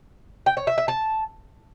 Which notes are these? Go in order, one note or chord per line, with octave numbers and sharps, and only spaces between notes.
G5
C#5
E5
E5
A5